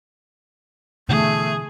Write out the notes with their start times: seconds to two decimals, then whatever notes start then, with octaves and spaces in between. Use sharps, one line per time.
1.09 B2 D3 E3 A3 G#4